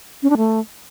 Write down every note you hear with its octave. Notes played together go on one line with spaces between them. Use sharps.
C#4
D4
A3